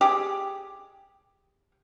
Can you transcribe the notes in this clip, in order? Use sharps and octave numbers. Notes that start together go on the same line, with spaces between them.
G4 G#4